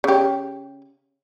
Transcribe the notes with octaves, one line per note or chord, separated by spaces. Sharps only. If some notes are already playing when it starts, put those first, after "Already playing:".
C#3 G4